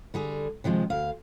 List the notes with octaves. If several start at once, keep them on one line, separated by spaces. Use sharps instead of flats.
D3 G3 G#4
C3 D#3 F3 G#3
D2 F5